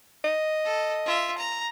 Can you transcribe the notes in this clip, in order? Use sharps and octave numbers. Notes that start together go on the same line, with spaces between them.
D#5
A4
F4 E5
A#5